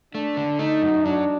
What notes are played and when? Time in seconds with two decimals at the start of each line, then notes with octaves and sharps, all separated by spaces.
0.14 A3 D4
0.37 D3
0.59 A3 D#4
0.82 F#2
1.05 F#3 D4